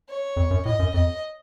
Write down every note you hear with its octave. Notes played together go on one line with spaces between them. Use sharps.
C#5
F2
F#2
A2 D#5
F#2
F2 D#5